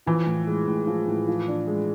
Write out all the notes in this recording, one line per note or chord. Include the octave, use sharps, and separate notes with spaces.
E3 F3
A2
G#3
A2
F3
A2
F3
D4
G#3